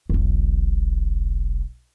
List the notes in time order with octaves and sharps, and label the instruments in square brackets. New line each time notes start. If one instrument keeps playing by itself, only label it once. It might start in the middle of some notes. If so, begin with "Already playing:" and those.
[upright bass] E1 B1